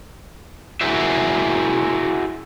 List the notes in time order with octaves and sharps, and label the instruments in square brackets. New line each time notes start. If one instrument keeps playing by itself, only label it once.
[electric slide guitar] E4 F#4 G#4 A#4 C5 E5